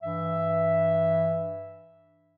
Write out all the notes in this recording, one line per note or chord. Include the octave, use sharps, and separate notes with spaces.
G2 E3 E5